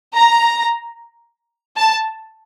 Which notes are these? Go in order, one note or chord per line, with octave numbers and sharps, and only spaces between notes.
A#5
A5